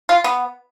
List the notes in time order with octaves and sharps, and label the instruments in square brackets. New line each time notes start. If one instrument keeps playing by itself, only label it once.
[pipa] F4
B3